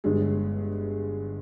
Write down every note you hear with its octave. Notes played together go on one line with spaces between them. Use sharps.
G1 G2 D3 G#3 G#4